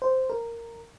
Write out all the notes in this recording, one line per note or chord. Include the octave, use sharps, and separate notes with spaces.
C5
A#4